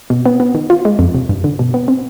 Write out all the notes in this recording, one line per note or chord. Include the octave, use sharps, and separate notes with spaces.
B2
B3
B3
D#3
F4
G#3
F2
C3
G2
D3
B2
B3
C4